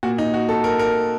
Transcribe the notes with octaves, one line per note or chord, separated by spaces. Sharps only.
A#2 F#4
D#4
F#4
A4
A#4
A#4